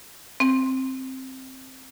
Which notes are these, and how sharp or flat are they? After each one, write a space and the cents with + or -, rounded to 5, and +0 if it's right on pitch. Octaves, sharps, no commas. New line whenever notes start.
C4 +5